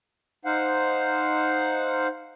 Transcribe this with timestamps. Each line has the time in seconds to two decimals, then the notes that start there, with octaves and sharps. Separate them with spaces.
0.45 D#4 C5 F5 F#5